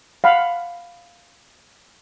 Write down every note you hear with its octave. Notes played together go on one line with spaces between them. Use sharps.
F5 F#5 B5